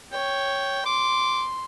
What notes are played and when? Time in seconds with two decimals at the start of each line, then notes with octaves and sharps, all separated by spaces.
0.12 C#5 G5
0.86 C6 D6